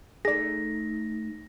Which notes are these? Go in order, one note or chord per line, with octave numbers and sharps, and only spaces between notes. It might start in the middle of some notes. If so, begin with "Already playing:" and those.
A3 D#4 G#4 A#4 D5 A#6